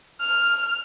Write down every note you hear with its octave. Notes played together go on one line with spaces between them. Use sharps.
F6